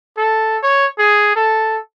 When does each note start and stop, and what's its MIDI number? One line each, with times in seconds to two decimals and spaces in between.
0.17 0.57 69
0.63 0.86 73
0.99 1.33 68
1.36 1.77 69